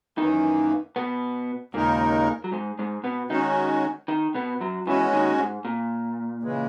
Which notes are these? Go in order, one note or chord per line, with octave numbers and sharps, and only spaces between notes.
F#2 D#3 E3 A#3 D#4
B2 B3
D#2 A#2 C#3 G#3 A#3 D#4 A#4
F#3
G#2 G#3
G#2 G#3
B2 B3
D#3 G#3 C#4 D#4 F#4
D#3 D#4
B2 B3
F#2 F#3
E2 E3 G#3 C#4 F#4
D#2 D#3
G#2
A#2
C#3 E3 G#3